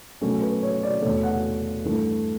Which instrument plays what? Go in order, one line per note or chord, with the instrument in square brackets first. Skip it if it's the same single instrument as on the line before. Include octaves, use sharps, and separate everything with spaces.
[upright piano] B2 F#3 A3 C#4
B4
C#5
D5
E2 B2 A3 C#5
F#5
G2 E3 A3